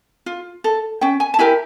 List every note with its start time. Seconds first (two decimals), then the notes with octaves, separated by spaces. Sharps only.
0.26 F4
0.64 A4
1.01 C#4 G5
1.20 G#5
1.34 A5
1.39 E4 G4 A#4 G#5